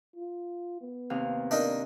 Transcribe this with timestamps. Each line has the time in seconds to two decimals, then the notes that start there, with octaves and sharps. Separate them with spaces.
0.16 F4
0.82 B3
1.10 D#2 C3 F5
1.51 D4 D#4 A#4